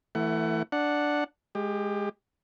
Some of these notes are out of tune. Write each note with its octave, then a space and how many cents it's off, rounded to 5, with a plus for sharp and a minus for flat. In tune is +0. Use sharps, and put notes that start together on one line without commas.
E3 +0 A3 +25 F#5 +25
D4 +0 F#5 -5
G#3 +0 G4 +20